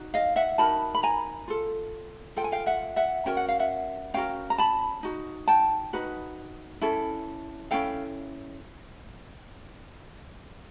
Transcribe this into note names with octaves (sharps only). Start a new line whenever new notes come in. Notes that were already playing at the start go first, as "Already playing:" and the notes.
Already playing: D#4 F#4
D#5 F5
E5 F#5
D#4 F#4 A#4 A5 B5
B5
G#5 A#5
F4 A4
F4 A4 G5
G#5
F5 G5
E5 F#5
E5 F#5
C#4 F#4 A#4 G5
F#5
F5
E5 F#5
C#4 F#4 A#4 F5 G5
A#5
A5 B5
D#4 F#4
G5 A5
D#4 F#4 B4
C#4 E4 A4
C#4 E4 A4 F5 G5